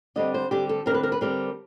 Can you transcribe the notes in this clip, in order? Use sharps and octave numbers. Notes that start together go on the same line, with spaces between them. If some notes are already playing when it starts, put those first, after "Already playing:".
D3 G3 C4 D#5
C5
D3 G3 C4 G4
A4
D3 G3 C4 A#4
B4
A#4
B4
D3 G3 C4 A#4